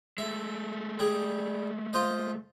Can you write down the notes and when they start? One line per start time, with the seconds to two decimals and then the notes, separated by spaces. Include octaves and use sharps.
0.18 G#3 A3 E5
0.99 G3 G#4
1.93 F4 C5 D#5